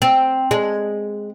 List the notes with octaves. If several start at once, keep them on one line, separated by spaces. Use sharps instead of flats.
C4
G#3